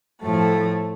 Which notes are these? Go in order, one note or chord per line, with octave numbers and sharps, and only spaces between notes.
A2 F3 A3